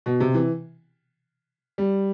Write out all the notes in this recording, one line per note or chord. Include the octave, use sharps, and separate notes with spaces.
B2
C3
E3
G3